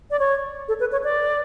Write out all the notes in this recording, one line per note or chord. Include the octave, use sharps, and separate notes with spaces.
D5
C#5
A4
B4
C#5
D5